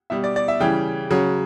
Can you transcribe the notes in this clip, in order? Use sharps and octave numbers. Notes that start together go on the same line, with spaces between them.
B2 G3 E5
D5
D5
E5
C#3 E3 G3 G5
C#3 F#3